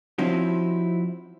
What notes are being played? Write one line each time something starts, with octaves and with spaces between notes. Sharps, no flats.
F3 C4 C#4 D#4 E4 F#4